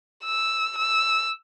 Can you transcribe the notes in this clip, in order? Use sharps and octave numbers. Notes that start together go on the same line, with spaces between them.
E6
E6